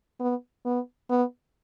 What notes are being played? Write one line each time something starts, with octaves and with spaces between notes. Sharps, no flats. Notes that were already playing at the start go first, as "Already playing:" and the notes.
B3
B3
B3